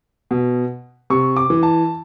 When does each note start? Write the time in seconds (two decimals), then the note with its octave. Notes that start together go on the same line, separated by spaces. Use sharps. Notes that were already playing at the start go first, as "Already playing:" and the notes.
0.31 B2
1.10 C3 C#6
1.37 D6
1.50 E3
1.63 A5